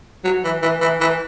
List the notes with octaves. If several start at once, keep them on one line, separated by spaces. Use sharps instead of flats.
F#3
E3
E3
E3
E3